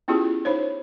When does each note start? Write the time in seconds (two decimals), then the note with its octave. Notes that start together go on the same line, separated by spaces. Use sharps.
0.08 B3 C#4 E4 F4 G4 G#4
0.45 D#4 C5 C#5